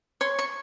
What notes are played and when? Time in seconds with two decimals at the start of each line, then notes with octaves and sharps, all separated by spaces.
0.21 C#5 C6
0.39 C#6